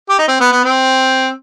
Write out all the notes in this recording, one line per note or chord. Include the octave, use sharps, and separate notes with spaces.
G4
D#4
C4
B3
B3
C4